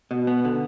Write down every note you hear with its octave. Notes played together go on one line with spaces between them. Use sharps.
B2
B3
D3